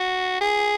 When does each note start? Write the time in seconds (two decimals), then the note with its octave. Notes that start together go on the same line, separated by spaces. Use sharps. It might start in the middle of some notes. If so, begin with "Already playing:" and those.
Already playing: F#4
0.41 G#4